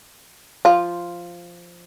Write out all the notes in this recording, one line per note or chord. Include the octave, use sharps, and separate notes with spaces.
F3 F4